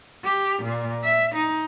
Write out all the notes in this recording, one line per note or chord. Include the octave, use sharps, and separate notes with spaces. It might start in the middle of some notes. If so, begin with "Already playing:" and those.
G4
A#2
E5
D#4